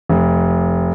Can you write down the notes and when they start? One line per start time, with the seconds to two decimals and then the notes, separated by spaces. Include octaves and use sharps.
0.09 F1